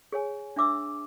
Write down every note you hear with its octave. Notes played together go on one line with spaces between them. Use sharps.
G#4 C#5 G#5
D4 E5 D6 E6